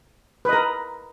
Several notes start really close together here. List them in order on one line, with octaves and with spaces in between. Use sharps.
B4 D#5 A#4